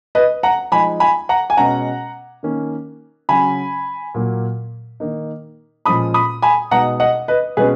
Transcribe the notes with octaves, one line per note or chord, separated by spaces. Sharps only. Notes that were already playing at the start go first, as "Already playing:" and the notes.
B4 D#5
F#5 A#5
F3 G#3 D#4 G#5 B5
G#5 B5
F#5 A#5
G#5
B2 G#3 C#4 F#5 A#5
D#3 A#3 C#4
C#3 F#3 C#4 G#5 B5
A#2 F#3 A#3
D#3 A#3 D#4
A#2 F3 G#3 C#4 B5 D#6
B5 D#6
G#5 B5
B2 G#3 D#4 F#5 A#5
D#5 F#5
B4 D#5
B2 G#3 C#4 G#4 B4